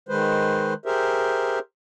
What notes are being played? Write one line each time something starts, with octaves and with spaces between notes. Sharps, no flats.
D#3 G#3 B4 C5
G4 G#4 A#4 C5 E5